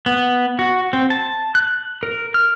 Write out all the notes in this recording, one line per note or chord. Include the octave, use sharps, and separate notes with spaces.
B3
F#4
C4
A5
F#6
A#4
F6